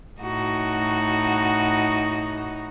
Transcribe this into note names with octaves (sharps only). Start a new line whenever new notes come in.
A2 D#4 F#4